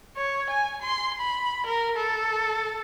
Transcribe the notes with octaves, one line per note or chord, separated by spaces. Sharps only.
C#5
G#5
C6
B5
A#4
A4